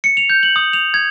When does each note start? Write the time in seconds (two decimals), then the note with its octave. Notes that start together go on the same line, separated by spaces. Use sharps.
0.04 C#7
0.17 F7
0.30 G6
0.43 F#7
0.56 D#6
0.73 F7
0.94 G#6